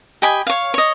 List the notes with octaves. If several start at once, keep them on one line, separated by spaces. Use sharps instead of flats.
G4 D#5 G#5 B5
C#5 F5
C#5 D#5